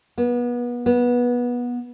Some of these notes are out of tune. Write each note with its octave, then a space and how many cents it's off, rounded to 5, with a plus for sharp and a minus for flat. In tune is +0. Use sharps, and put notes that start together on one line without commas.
B3 -30
B3 -20